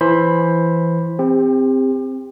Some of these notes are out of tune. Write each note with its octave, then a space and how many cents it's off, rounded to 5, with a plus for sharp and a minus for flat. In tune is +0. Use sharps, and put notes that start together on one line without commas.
E3 +15 C5 +15 B5 +0
C4 +0 G4 +35